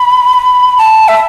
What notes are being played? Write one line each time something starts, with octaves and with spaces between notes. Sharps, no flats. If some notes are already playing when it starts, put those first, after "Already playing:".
Already playing: B5
A5
E5